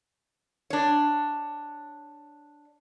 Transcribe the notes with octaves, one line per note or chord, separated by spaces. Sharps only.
D4 C#5